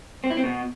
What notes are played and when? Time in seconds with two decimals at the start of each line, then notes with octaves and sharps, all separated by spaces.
0.24 C4
0.30 E4
0.37 C4
0.44 B2